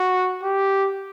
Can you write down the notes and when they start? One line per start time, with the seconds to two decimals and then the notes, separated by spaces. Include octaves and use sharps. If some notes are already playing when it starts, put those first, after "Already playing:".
Already playing: F#4
0.43 G4